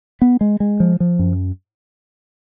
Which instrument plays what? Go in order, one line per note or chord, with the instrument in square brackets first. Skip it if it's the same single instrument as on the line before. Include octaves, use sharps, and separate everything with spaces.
[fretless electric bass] B3
G#3
G#3
F3
F3
F#2